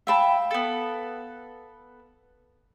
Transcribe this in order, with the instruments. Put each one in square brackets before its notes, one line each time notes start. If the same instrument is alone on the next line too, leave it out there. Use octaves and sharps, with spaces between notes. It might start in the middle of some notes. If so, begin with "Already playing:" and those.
[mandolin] E5 G5 A5 [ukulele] F5 B5
[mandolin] B3 A4